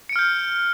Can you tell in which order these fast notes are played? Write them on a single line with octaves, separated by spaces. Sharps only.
C#7 D7 F6 G6